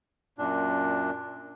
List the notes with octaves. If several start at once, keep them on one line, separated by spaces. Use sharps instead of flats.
F#2 A#2 D4